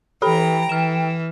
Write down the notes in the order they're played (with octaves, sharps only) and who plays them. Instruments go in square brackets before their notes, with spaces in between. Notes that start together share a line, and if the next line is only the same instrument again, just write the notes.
[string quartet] E3 A#5 [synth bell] G4 A4 B5 [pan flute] G5
[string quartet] E3 [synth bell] F6 E7